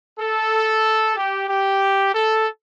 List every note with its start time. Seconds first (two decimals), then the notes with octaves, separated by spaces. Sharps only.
0.19 A4
1.16 G4
1.48 G4
2.13 A4